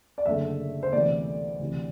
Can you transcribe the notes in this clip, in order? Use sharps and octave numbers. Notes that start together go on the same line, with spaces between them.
D5
F#1 F#2 D3 A3 E5
C5
D2 C3 E3 B3 D5
D2 C3 E3